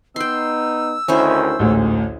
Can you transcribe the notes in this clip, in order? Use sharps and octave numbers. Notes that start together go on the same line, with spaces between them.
B3 D#4 G5 C6 E6
D2 D#3 C#4 E4 C5
A1 D2 G#2